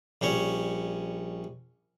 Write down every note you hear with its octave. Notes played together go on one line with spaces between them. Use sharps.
A#1 G3 C#4 C#5